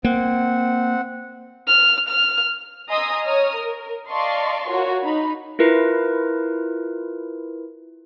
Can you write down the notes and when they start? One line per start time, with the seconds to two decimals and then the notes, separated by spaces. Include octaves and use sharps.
0.04 A#3 C4 F#5
1.68 F6
2.08 F6
2.89 D#5 G#5 A#5 C6 D#6 E6
3.24 C#5 A#5 D#6 F6
3.56 A#4
4.09 D5 D#5 F5 A5 C6 C#6
4.69 F4 F#4 A#4 C#5
5.03 D#4 B5
5.59 E4 F4 A#4 B4